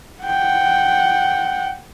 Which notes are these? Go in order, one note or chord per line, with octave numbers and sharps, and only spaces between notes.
F#5 G5